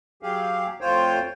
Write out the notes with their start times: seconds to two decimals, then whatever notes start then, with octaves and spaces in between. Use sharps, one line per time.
0.23 F#3 G4 G#4 F5
0.81 F2 A2 F4 C5 C#5 G5